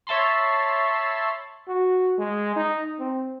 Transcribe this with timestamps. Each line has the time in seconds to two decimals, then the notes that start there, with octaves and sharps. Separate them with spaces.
0.07 C#5 E5 A5 B5 C6
1.68 F#4
2.18 G#3
2.56 D#4
3.00 C4